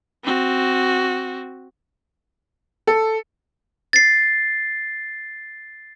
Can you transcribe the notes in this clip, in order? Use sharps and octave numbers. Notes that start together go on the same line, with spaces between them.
C4 F#4
A4
A6 C7